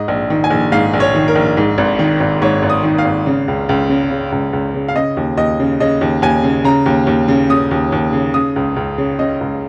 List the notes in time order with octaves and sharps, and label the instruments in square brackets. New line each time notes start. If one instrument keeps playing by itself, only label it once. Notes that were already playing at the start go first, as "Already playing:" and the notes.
Already playing: [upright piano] G#2 D#5
A#1
D#3
G#5
A#1
G#2 F5
A#1
C#5
D#3
A#4
A#1
G#2
G#1
D#3
G#1
G#2 C#5
G#1
D#6
D#3
F5
G#1
C#3
C#2
C#2
C#3
C#3
C#2
C#2
C#3
F5
C#3 D#5
D#2
D#2 D#5
C#3
C#3 D#5
D#2
D#2 G#5
C#3
C#3 A#5
D#2
D#2
C#3
C#3 D#6
D#2
D#2
C#3
C#3 D#6
C#2
C#2
C#3
C#3 D#5
C#2